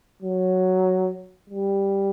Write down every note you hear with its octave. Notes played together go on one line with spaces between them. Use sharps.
F#3
G3